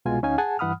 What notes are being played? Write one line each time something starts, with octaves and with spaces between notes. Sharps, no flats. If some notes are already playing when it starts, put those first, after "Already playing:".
C2 B2 G#3 F4 F#4 G#5
D2 C#4 D#4 F5 G#5
G#4 F#5 G#5 A5
G2 E3 F#5 B5 D#6 F6